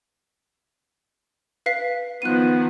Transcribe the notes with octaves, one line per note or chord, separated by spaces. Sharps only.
B4 F5 B6
D#3 F3 B3 F#6 D#7